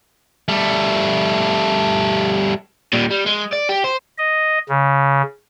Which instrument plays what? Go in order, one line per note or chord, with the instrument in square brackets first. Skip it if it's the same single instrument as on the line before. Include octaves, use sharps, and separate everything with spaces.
[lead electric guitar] G3 A3
[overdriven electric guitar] A#2 G3
G3
G#3
D5
G4
C5
[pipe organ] D#5
C#3